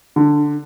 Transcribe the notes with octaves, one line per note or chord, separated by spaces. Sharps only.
D3